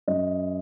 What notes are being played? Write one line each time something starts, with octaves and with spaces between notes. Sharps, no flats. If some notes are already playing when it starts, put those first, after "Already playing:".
F#2 D#5